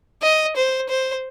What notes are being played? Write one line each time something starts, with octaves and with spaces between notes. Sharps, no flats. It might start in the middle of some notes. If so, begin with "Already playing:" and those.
D#5
C5
C5